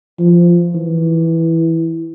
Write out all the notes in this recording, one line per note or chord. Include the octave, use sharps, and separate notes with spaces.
F3
E3